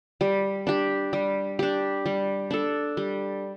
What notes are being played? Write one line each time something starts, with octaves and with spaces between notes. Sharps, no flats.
G3
D4 G4
G3
D4 G4
G3
D4 A4
G3